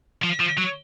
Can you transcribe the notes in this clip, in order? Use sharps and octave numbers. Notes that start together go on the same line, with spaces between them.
F3
F3
F#3